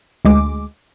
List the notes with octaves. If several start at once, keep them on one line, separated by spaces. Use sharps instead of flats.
D2 G#3 D6